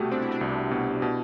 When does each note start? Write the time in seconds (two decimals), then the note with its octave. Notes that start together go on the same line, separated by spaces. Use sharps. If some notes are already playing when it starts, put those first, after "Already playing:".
Already playing: C2 B2 A3 F#4 G4
0.11 C4 D4
0.21 E4
0.31 D4
0.41 C2
0.71 B2
1.02 B2